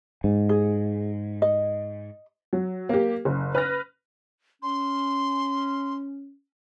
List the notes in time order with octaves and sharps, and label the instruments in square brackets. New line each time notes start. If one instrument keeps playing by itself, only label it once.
[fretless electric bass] G#2
[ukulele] G#4
D#5
[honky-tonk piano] F#3
A#3 G4
F#1
B4 F6 A#6
[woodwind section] C#4 [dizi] C6